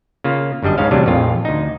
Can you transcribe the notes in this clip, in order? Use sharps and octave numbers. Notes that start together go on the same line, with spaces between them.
C#3 A#3 F4
G1 F#2 G3 D4 D#5
C#2 G#2 C#3 C#4 F5
E2 A2 C3 F#3 G3 D4
A#1 F2 A2 F4
D2 D#4